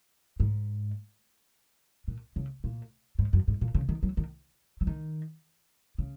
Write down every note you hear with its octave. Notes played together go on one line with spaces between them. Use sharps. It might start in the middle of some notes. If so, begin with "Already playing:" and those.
G#2
A#2
C#3
A#2
G#2
F#2
G#2
A#2
C#3
D#3
F#3
D#3
F#3
D#3
C#3